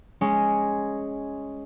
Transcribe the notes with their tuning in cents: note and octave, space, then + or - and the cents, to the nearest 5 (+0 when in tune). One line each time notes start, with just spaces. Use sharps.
G#3 +0 C#4 +0